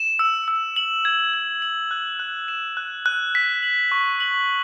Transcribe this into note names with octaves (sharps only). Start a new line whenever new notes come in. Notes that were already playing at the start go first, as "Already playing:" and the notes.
Already playing: E7
E6
E6
F#7
G#6
G#6
F#7
F#6
F#6
E7
F#6
F#6
B6
F#7
C#6
F#7